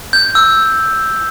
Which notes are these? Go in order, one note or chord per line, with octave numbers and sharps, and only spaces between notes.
G6
E6